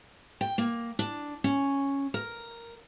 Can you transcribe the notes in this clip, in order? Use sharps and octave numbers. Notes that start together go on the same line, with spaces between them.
G5
A#3
D4
C#4
A#4